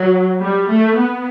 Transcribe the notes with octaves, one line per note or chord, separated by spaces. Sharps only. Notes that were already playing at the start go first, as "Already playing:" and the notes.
Already playing: F#3
G3
A3
B3